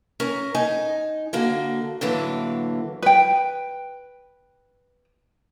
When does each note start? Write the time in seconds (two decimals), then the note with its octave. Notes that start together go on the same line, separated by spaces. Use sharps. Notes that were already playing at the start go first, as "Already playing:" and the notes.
0.20 C#4 A#4
0.55 D#4 G#5
1.33 D3 A#3 F#4
2.01 A2 D3 E3 F#3 A#3
3.02 B4 G5